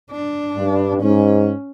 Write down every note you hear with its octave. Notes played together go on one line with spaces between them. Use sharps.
D4
G2
G#2 C#4